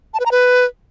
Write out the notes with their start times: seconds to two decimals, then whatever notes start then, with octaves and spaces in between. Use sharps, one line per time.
0.14 A5
0.20 B4
0.25 A#5
0.31 B4